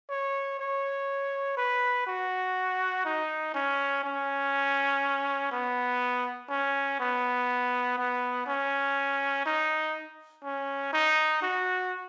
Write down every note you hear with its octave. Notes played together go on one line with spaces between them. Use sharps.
C#5
C#5
B4
F#4
D#4
C#4
C#4
B3
C#4
B3
B3
C#4
D#4
C#4
D#4
F#4